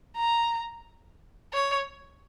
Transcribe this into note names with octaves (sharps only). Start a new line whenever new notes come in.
A#5
C#5